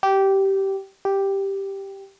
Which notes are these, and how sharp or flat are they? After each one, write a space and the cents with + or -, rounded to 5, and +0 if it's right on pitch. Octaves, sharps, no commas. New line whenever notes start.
G4 -15
G4 +0